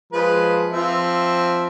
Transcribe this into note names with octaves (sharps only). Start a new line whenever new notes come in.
F3 G#3 B4
F3 C4 E5